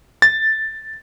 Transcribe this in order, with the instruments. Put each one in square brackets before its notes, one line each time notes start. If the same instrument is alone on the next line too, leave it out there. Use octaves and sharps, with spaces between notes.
[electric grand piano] A6